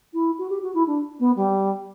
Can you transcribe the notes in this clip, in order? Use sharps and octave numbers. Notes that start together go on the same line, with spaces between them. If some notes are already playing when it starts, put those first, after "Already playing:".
E4
F#4
G4
F#4
E4
D4
B3
G3